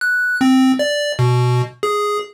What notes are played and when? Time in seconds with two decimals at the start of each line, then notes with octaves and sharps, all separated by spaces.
0.01 F#6
0.41 C4
0.79 D5
1.19 B2
1.83 G#4